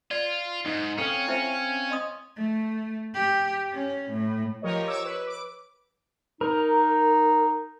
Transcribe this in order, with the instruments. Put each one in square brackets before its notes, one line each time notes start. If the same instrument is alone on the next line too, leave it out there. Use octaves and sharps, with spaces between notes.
[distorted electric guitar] F4 [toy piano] D5
[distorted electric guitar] G#2 [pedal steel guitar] D#4
[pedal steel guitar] C4 C#5 F5 [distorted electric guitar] C#4 [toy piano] A4
[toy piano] E4 C5 E5
D#5 C6 D#6
[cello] A3
G4
C#4
A2
[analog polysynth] F3 G4 A#4 C#5 D#5
C#5 D6 E6
B4
D6
[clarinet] D#4 [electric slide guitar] A#4